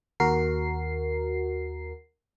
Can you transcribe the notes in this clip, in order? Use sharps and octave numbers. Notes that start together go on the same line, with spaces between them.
D#2 F#4 A#4 C7